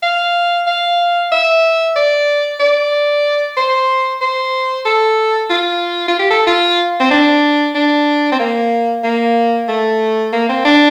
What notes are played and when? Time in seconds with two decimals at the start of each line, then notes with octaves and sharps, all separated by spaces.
0.03 F5
0.67 F5
1.32 E5
1.96 D5
2.60 D5
3.57 C5
4.21 C5
4.85 A4
5.50 F4
6.08 F4
6.19 G4
6.30 A4
6.47 F4
7.00 C4
7.11 D4
7.75 D4
8.32 C4
8.40 A#3
9.04 A#3
9.68 A3
10.33 A#3
10.49 C4
10.65 D4